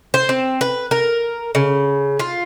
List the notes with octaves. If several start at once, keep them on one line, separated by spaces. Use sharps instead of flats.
C5
C4
B4
A#4
C#3
F4